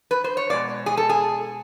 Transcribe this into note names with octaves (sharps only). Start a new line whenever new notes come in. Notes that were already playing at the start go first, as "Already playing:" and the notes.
B4
C5
C#5
B2 G#3 D5
G#4
A4
G#4